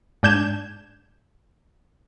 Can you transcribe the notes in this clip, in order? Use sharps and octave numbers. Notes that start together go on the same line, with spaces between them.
G#2 D4 G6 G#6 E7